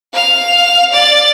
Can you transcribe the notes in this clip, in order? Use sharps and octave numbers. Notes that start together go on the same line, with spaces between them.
F5 F7
D5 A6